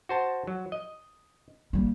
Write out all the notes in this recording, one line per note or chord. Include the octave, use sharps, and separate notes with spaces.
F#4 C5 A5
F#3
D#5
G3 A#3